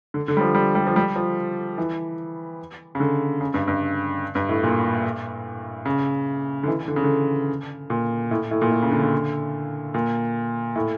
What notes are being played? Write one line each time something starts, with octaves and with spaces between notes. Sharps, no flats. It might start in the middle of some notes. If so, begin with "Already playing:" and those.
D3
D3
G3
F3
G3
G3
F3
G3
F3
E3
C#3
D3
C#3
G2
G2
G2
A2
A#2
C#3
D3
E3
D3
C#3
D3
A#2
A2
A2
A#2
A2
C#3
D3
D3
A#2
A2